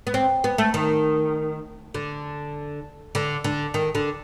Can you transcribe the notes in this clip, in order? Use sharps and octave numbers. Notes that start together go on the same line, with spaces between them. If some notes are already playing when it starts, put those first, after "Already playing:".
B3
C4
B3
A3
D#3
D3
D3
D3
D#3
D3